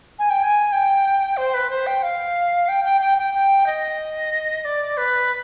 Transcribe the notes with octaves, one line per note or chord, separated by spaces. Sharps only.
G#5
G5
G#5
G5
C5
B4
C5
G5
F5
G5
G5
G5
G5
G5
D#5
D5
B4